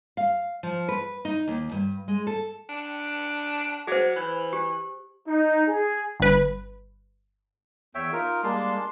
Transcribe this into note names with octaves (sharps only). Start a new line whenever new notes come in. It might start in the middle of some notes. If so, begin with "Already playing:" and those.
F5
F3
B4
D#4
D#2
G2
G#3
A4
D4
F#3 G#4 C5
E3
G4
D#4
G#4
G1 B4
E2 C#5 E5 G5
D#4 F4 A#4
G3 G#3 A#3 D4 A5 C6